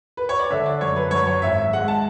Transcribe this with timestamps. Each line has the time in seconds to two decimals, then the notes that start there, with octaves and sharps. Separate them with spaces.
0.17 B4
0.29 C#5
0.39 D5
0.50 D3 E5
0.66 D5
0.81 F#2 C#5
0.96 B4
1.11 F#2 C#5
1.27 C#5
1.42 G#1 E5
1.58 E5
1.73 G#3 F#5
1.88 A5